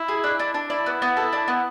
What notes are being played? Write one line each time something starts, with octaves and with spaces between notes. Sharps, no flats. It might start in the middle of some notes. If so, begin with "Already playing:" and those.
Already playing: E4
G#4
D4
D4
D4
E4 D5
B3
B3
A4
D4
B3